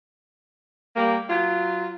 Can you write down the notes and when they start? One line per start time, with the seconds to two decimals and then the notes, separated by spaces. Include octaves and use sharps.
0.96 G3 A#3
1.29 F#3 F4